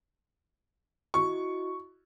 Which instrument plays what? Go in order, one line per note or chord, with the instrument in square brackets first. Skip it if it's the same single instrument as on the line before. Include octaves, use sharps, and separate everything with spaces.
[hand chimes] E4 F#4 D#5 [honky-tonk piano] C#6